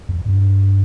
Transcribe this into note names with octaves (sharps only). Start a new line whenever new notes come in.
F2
G2